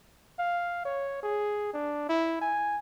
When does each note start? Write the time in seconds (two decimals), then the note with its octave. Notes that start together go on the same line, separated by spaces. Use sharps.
0.39 F5
0.85 C#5
1.23 G#4
1.74 D4
2.09 E4
2.42 G#5